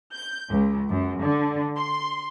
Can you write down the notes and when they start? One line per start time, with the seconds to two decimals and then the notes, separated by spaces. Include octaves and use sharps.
0.14 G6
0.50 C#2
0.89 F#2
1.21 D3
1.76 C6